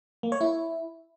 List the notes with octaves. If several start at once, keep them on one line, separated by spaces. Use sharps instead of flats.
A#3
C#5
E4